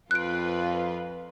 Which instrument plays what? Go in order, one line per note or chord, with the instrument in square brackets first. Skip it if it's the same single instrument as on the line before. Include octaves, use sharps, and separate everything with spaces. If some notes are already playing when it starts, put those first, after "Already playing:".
[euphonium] F2 [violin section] F4 B4 [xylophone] F#6 D7